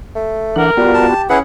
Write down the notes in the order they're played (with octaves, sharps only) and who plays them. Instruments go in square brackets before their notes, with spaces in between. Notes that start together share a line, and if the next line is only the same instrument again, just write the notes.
[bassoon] A3
[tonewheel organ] E3 D4 F#5 [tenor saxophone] A#4
[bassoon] G3 [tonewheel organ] B3 F4 F#4
[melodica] A5
[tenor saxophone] G4
[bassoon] E3 [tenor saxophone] C#4 [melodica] E4 G#4 F#5 [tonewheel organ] B4